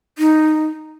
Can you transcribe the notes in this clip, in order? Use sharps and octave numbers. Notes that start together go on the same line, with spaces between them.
D#4